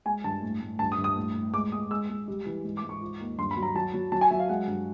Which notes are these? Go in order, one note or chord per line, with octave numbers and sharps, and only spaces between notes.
G#3 G#5
G2 A5
A2
A2
G2 A5
D#6
G2
D#6
A2
A2
G#3 D6
G#3 D#6
G#3 E6
G#3
G3
E3
G#2
D6
G#2
C#6
F3
D#2
G2 C6
B5
F#3
A#5
F#3 A5
F#3
F#3 A5
G#5
F#3 E5
F5
G#3 F#5
G2